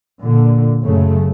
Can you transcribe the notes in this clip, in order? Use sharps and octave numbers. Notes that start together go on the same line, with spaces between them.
A#2 D3
F#2 C#3 A3